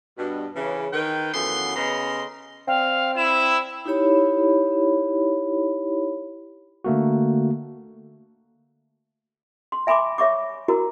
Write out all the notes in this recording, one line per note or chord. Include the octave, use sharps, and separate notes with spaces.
G2 B2
C#3 E3
D#3 B4 G5
F#2 E3 A3 B3 F4 C6
C#3 B3 D#5 A#5 C6
C4 D5 F5 G5
E4 E7
D#4 E4 G4 C#5 B5
D3 A3 A#3 F#4
C6
E5 G#5 B5 C6 D6
C#5 E5 C#6 D6
E4 F#4 A#4